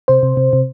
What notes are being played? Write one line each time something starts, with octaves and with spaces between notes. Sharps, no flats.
C3 C5
C3
C3
C3